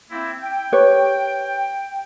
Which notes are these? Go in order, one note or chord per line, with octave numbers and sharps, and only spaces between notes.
A#3 C4 E4
G5
G4 B4 C#5